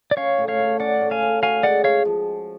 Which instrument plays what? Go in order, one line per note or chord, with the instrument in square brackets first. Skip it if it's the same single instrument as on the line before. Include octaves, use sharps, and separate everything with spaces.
[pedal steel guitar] D5
[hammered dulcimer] C#4 [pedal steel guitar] C#5 F5
[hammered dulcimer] A2
[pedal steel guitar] C#5 F5
[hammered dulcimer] A2
[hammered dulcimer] C#4 [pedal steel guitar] D5 F#5
[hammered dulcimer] A2
[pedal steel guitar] F5 G#5
[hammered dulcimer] A2
[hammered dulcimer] F#4 [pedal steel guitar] F5 G#5
[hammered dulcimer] G#3 [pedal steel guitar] D5 F#5
[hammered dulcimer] G#3 [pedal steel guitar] C#5 F5
[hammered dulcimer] F3